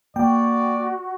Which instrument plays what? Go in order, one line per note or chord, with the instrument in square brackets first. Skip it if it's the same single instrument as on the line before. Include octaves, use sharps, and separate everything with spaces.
[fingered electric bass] A#3 [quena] F#4 [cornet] D5 [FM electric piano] G5